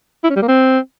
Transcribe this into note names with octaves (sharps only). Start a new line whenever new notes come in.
E4
C#4
G3
A#3
C4